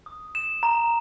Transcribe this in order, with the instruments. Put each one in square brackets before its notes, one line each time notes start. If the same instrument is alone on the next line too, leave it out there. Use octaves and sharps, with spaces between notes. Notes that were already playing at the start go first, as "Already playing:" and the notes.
[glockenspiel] D#6
E7
A#5